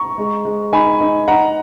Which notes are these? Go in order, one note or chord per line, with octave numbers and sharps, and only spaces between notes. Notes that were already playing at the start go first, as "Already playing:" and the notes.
Already playing: A#5 C#6
G#3
G#3
D#4 G#5 B5
D#4
D#4 F#5 A#5